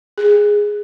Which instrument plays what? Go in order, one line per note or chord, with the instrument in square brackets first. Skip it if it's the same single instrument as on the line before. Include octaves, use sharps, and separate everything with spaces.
[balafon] G#4